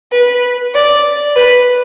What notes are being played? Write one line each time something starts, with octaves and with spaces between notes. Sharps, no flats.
B4
D5
B4